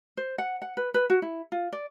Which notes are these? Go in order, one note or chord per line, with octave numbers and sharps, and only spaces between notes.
C5
F#5
F#5
B4
B4
F#4
E4
F4
D5